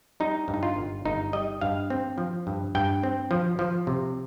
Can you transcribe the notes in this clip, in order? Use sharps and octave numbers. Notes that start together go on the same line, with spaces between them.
G3 D#4
G2
D#4
F4
G1
G1 D#4
G3 D#5
G2 F5
C4
F3
G2
G2 G5
C4
F3
F3
C3